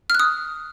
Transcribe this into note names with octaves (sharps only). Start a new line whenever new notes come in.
D#6 F6 F#6